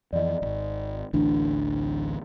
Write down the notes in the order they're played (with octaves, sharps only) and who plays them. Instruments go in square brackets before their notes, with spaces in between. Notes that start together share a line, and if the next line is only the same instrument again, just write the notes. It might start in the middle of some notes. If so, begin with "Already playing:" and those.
[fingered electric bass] F2 E3 [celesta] D5 D#5
[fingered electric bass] D#1 G#1
[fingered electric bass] A1 D2 E3 [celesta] D4